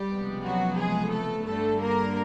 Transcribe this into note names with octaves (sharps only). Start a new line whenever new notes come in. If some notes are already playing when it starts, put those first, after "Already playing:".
Already playing: G3 G4
C#2 C3 F3 G#3 B3
F#3 F#4
G#3 G#4
A3 A4
G2 D3 G3 A3 A4
A#3 A#4